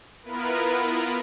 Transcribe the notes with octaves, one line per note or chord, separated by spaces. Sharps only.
B3 E4 F4 A#4 B4